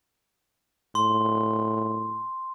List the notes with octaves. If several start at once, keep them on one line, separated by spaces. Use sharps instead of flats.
A2 C6